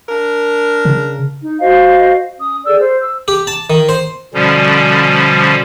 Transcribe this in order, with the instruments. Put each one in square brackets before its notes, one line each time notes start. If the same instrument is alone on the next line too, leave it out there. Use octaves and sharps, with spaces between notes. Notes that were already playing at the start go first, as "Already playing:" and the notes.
[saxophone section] D4 A#4
[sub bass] C#3
[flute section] D#4
F#4 C5 D#5 F5
C#4 D#6
G#4 A4 D5 E6
C5
E6
[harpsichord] G4
A5
D#3
C5
[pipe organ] B2 D3 F3 G3 C#4